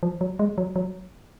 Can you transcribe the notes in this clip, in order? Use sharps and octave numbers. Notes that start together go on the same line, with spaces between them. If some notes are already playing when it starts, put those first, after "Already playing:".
F3
F#3
G#3
F#3
F#3